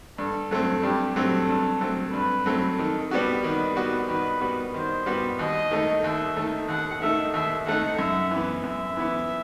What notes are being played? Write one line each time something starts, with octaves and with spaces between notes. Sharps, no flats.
G2 A4
F#3 A3 C4
G2 G4
F#3 A3 C4 A4
G2
F#3 A3 C4
G2 B4
F#3 A3 C4
D#3 A4
G3 B3 F#4 G4
D#3 B4
G3 B3 F#4
D#3 B4
G3 B3 F#4
D#3 C5
G3 B3 F#4
D#2 D#5
D#3 A3 D#4
D#2 E5
D#3 A3 D#4
D#2 F#5
D#3 A3 D#4 E5
D#2 E5
D#3 A3 D#4 F#5
F#2 E5
E3 B3
F#2 E5
E3 B3